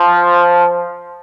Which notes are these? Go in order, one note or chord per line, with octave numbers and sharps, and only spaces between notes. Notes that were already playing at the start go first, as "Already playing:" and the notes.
Already playing: F3